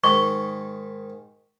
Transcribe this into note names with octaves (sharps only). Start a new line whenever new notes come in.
G#2 D#3 C#6